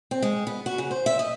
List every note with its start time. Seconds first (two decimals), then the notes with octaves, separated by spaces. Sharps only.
0.11 C4
0.22 G#3
0.47 B3
0.66 F#4
0.78 C#3
0.91 C5
1.06 E5
1.19 D#5